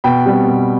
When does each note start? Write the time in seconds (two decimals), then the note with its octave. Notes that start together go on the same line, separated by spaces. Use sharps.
0.04 B2 G5 B5
0.26 G3 C4
0.47 B2